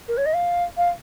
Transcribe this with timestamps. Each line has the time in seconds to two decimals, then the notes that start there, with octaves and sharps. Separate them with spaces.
0.08 A#4
0.17 C#5
0.26 D#5
0.34 F5
0.77 F5